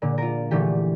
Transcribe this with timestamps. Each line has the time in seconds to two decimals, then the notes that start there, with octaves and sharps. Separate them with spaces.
0.02 A#2 D3
0.18 F4 A#4
0.51 A#2 D3 E3 A3 G4